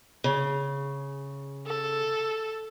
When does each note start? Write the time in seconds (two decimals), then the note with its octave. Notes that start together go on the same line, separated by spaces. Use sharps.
0.24 C#3
1.66 A4